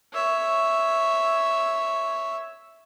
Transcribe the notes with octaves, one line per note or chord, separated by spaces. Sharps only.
C#5 E5